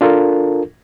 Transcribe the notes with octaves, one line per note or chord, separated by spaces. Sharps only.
D4 F4 A4 A#4